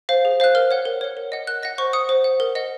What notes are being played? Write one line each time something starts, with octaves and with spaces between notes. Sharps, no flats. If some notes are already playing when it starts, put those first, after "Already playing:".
C5 F5
G#4
C5 F5 F#6
A#4 F6
C#5 F#5
A#4
C#5 F#5
A#4
D#5 F#5
A#4 F#6
D#5 F#5 A#6
C5 C#6
F#5 D#6
C5
F#5
A#4
D#5 F#5